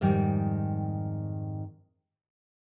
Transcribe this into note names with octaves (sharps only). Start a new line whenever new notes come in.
F2 G#2 D#3 G3